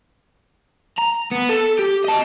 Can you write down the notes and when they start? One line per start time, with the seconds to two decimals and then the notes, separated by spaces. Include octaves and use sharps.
0.98 A#5
1.32 B3
1.49 A4
1.79 G4
2.05 D#5 A5